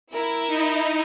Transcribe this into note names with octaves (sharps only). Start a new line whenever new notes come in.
E4 A#4
D#4